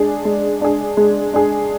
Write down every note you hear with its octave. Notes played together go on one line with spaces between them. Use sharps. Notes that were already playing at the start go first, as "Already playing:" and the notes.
Already playing: G#3 D4 G#4
G#3
D4 G#4
G#3
D4 G#4